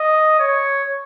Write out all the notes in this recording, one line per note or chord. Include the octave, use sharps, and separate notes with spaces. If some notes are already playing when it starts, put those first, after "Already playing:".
Already playing: D#5
C#5